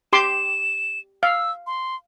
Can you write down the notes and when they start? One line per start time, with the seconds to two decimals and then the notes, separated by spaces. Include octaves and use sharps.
0.13 G4 C6 D6 E7
1.23 F5 E6
1.67 C6